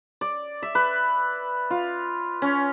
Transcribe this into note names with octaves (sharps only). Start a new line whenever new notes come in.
D5
E5
B4
F4
C#4